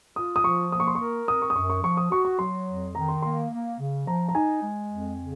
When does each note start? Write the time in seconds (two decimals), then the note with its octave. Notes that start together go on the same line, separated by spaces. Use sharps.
0.16 F4 D#6
0.36 D#6
0.44 F3 C#6
0.72 A#3 D#6
0.80 C#6
0.87 C6
0.95 A#4 C#6
1.27 C4 D#6
1.42 C#6
1.50 D#6
1.56 F#2 C#6
1.70 C#6
1.83 F3 C#6
1.97 D#6
2.12 F#4 C#6
2.25 C#6
2.39 F#3 C6
2.68 F2
2.95 D#3 A#5
3.08 C6
3.22 A#3 C6
3.51 A#3
3.79 C#3
4.07 F3 A#5
4.29 A#5
4.34 D#4 G#5
4.62 G#3
4.91 F2
5.19 C#3